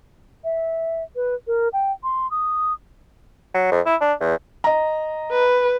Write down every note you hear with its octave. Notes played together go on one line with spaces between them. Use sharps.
E5
B4
A#4
G5
C6
D#6
F#3
F2
E4
D4
E2
D#5 A#5
B4